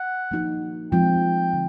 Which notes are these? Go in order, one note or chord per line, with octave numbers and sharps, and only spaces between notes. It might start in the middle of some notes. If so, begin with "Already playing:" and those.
Already playing: F#5
F3 A#3 D#4 F#4
F3 G#3 C4 F4 G5
D3